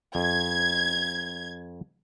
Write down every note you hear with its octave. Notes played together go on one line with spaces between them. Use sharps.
F2 G#6